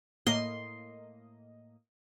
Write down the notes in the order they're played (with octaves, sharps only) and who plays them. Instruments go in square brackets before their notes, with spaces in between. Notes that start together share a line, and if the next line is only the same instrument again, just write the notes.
[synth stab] A2 A#3 D#5 [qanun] C6